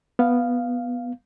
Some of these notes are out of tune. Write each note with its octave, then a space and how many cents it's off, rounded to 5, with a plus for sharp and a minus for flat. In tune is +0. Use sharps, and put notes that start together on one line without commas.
B3 -5 F5 +0